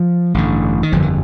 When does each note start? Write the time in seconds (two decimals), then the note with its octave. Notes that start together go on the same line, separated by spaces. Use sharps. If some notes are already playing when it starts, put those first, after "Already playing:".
Already playing: F3
0.34 A1 G2 D3
0.83 D#3
0.92 G1 F2 D3 F3
1.02 D#3